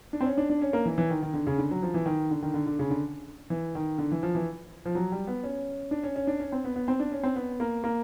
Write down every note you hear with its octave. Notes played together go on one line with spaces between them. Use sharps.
D4
C4
C#4
D4
D4
C#4
A#3
E3
E3
D#3
D#3
D3
C#3
D3
F#3
F3
E3
D#3
D3
D#3
D3
D3
C#3
D3
E3
D#3
D3
E3
F3
E3
F3
F#3
G3
B3
C#4
D4
C#4
C#4
D4
C#4
C4
B3
B3
C4
D4
C#4
C4
B3
A#3
A#3